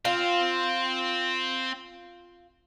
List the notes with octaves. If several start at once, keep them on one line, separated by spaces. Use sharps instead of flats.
C4 F4